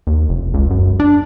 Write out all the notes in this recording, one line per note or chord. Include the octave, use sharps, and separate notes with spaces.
D#2
F1
C#2
F#2
D4